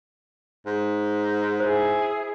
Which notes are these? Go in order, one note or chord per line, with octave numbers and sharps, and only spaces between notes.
G#2
E4 G#4 C5